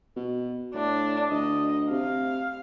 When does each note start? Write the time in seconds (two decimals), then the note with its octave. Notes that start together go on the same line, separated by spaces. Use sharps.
0.16 B2
0.74 A2 D4
1.31 D2 D#5
1.91 C3 F5